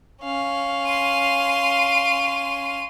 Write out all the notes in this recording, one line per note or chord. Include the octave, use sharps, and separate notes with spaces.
C#4 F5
C6 D#7